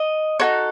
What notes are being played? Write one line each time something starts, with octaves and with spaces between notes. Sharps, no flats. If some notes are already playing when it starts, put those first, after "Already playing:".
Already playing: D#5
D#4 F#4 A4 C#5